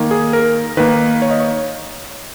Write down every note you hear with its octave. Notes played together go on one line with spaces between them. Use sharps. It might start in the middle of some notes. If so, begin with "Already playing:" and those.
Already playing: D#3 A#3
G#4
A#4
D#3 A#3 B4
C#5
D#5
C#5